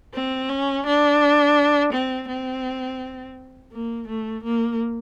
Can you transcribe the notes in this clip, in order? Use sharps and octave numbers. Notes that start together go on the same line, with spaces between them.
C4
C#4
D4
C4
C4
A#3
A3
A#3